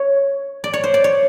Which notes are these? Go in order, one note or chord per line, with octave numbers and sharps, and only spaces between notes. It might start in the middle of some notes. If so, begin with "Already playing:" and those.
Already playing: C#5
D5
C#5
C5
D5
C#5